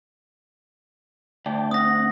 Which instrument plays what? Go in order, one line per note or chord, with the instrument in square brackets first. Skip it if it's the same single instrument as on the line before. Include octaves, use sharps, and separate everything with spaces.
[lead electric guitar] D2 [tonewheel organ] D5 G5 A5
[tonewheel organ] C4 F#5 [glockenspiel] D#6 A#6